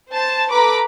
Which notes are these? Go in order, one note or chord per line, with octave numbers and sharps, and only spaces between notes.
C5 A5
A4 B4 A#5 D6 B6